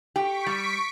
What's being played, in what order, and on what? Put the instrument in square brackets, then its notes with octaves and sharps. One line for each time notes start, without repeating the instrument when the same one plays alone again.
[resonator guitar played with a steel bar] G4 [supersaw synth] C#6 B6 D7
[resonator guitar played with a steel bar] G3